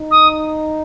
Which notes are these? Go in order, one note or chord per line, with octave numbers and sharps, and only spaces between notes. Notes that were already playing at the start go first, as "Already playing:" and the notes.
Already playing: D#4
D#6